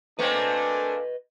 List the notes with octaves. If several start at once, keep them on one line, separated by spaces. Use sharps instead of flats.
A3 A#3 C4 D4 A4 B4 D#5 G#5